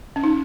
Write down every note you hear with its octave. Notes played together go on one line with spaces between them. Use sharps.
C#4
D#4